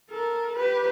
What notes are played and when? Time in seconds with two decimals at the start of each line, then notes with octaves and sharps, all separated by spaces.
0.10 A4 A#4
0.55 G4 B4